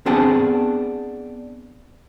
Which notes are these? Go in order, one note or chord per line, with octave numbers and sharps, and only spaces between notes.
B3 C4 D4 G#4 F#5 A5